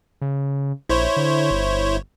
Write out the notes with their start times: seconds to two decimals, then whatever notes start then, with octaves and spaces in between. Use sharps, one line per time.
0.21 C#3
0.89 A#1 E4 C5 C#5
1.17 D3
1.51 G1